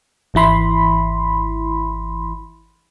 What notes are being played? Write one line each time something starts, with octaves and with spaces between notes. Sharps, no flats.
G#1 E3 E4 B5 C6